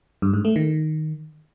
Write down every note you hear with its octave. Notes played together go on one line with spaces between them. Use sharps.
G2
G#2
A3
D#3